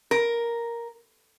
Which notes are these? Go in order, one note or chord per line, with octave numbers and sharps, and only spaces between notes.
A#4